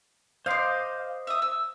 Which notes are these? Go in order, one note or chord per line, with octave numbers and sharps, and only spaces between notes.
C5 D#5 F5 C6 D6
E5 D#6
E6